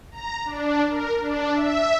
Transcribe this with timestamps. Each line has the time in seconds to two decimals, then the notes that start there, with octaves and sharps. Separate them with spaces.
0.12 A#5
0.45 D4
0.89 A#4
1.21 D4
1.54 E5